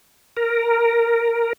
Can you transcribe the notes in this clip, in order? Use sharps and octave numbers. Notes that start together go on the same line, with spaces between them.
A#4